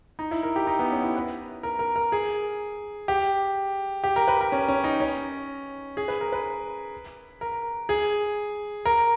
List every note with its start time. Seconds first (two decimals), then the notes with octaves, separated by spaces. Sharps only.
0.19 D#4
0.31 E4
0.43 A#4
0.56 G4
0.67 D#4
0.79 B3
0.92 C#4
1.03 E4
1.16 B4
1.63 A#4
1.79 A#4
1.96 A#4
2.12 G#4
3.08 G4
4.04 G4
4.16 A#4
4.28 B4
4.41 A#4
4.52 C#4
4.69 C#4
4.84 D#4
5.00 C#4
5.97 G#4
6.08 B4
6.21 A#4
6.33 B4
7.41 A#4
7.89 G#4
8.85 A#4